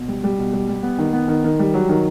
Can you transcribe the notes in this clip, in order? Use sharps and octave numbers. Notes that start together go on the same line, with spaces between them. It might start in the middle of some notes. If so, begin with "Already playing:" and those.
Already playing: B2
G3
G3
B2
G3
G3
B3
D#3
B3
D#3
D#3
G3
F#3
D#3